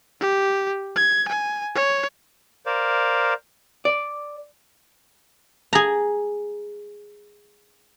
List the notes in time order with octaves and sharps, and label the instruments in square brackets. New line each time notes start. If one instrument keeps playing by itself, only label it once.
[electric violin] G4
G#6
G#5
C#5
[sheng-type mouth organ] A#4 C5 D5 F5
[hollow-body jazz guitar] D5
[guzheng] G#4 A#5